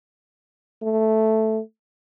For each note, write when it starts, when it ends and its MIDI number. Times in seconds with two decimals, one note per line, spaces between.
0.83 1.60 57